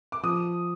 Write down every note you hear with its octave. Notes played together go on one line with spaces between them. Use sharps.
D6
F3 D#6